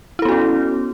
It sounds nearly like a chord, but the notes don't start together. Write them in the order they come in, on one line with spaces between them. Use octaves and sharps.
E4 A4 B3 F#4 C#4